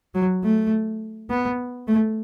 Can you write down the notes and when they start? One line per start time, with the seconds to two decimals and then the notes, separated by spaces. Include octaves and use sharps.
0.15 F#3
0.43 A3
1.30 B3
1.88 A3